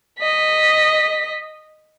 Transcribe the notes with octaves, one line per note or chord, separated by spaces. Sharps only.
D#5 B6